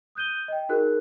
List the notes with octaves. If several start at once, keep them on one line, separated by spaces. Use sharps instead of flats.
D#6 F#6 G6 D#7 G7
D#5 G5
D#4 F#4 G#4 A#4 F#6